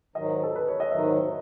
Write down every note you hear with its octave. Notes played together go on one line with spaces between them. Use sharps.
G#2 D#3 F#3 D#5
A4
B4
C#5
D#5
G#2 D#3 F#3 E5